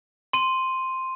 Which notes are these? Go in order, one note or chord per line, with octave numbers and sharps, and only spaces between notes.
C6 D#7